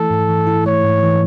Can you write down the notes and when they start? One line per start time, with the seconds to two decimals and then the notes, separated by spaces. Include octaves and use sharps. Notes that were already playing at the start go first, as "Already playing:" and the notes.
Already playing: E3 A3 E4 A4
0.10 G#2
0.29 E3
0.47 E4
0.66 A3 C#5
0.83 G#2
1.03 E3